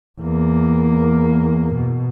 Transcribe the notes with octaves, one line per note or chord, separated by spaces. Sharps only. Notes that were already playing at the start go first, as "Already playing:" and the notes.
E2 A#3
B2